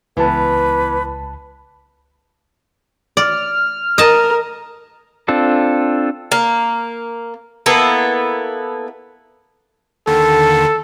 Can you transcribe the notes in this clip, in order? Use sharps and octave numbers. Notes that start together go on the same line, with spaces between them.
C#2 E3 B3 B4 A5
D5 F6
A#4 D#5 A5
C4 D4 F4 A4
A#3
A#3 B3 E4 A4
D#2 D3 D#3 A4